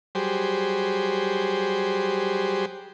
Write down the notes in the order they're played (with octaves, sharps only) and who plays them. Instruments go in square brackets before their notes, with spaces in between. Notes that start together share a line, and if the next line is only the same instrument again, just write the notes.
[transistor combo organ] F#3 G3 G4 G#4 C5